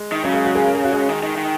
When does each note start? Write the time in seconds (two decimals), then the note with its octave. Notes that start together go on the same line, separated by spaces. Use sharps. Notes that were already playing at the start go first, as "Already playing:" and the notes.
Already playing: G#3
0.12 D#3
0.23 C#3 F#3
0.34 G#3
0.45 F#3 F#4
0.55 G#3 G#4
0.66 A#4
0.75 G#4
0.84 F#4
0.92 G#3 G#4
1.09 D#3
1.23 D#3
1.37 D#3